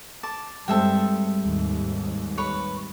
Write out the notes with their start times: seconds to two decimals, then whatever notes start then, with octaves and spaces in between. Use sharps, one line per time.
0.23 A5 D6
0.68 G2 G3 G#3 C4 A4 E5 G5
1.43 D#2 G#2
2.38 B4 C#5